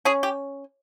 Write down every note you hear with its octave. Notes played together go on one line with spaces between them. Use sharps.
C#4 G#4
G4